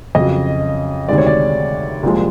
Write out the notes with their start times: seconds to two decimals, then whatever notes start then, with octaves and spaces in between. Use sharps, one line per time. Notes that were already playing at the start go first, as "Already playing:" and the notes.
0.15 F2 C#3 F#3 D#5
1.09 D2 C3 D#3 G#3 D5
1.18 C#5
1.27 D5
2.03 C2 A#2 F3 G#3